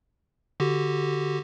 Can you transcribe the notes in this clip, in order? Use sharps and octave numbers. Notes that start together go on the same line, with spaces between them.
D3 F#4 G4